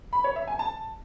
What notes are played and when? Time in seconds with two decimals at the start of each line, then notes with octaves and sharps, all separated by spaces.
0.13 B5
0.24 C#5
0.36 E5
0.47 G#5
0.59 A5